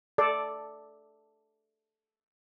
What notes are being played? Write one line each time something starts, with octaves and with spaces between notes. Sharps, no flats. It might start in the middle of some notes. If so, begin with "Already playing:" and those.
A4 D5